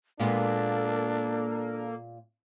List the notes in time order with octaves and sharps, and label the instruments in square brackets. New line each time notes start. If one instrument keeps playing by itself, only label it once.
[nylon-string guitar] A#2 G#3 B3 [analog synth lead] A#3 [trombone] D4 [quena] A4